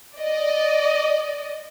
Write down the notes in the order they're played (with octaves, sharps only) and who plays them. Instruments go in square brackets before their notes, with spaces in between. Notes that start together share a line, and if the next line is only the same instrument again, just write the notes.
[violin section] D5 D#5